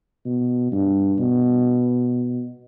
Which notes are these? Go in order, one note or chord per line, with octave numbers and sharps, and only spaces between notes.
B2
G2
B2